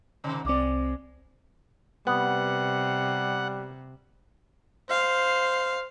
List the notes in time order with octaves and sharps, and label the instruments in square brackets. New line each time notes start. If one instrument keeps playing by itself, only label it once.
[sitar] G#2 C3 D#3
[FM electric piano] C2 C4 [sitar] G#3 D5
[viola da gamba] C3 [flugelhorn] G3 [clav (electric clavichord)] B3 [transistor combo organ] F#5
[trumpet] C5 [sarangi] F5